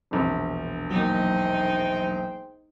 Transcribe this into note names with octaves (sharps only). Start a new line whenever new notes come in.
E1 A#1
F#3 G#3 A#3 D#4 C5 G5